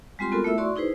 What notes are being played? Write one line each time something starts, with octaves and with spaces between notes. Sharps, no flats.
G3 G#3 C4 F4 G4 C6
B3 F4 F#4 A4 A#4
A3 E4 E5 E6
F#4 D5 C6 C#6
D#4 E4 G#4 B4 C5